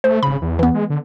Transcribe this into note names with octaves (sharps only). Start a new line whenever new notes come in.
A3 C5
G#1 C#3 B5
E2
E3 B3
G#3
D3